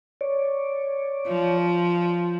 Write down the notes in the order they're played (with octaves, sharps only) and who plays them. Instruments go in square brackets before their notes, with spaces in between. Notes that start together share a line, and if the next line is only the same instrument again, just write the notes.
[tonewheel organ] C#5 D5
[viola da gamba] F3